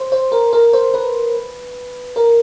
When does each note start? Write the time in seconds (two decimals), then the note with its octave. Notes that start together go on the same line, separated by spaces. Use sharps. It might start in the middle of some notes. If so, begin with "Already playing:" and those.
Already playing: C5
0.12 C5
0.32 A#4
0.53 A#4
0.73 C5
0.94 B4
2.16 A#4